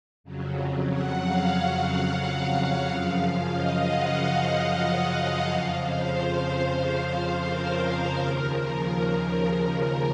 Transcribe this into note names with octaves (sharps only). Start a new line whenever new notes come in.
F2 C#3 F#3
F#5
F5
F5
F#2 C#3 F3
D#5
F#5
F2 C#3 F3 F5
C5
A#4
A#4
D#2 C#3 F3